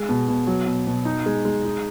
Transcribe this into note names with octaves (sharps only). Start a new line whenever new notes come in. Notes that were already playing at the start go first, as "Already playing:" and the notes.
Already playing: G#3
B2
B2
F#3
B2
B2
D#4
G#3
G#3
D#4